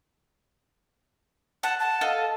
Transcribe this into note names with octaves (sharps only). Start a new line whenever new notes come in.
F#5 A5
A5
A4 D#5 F5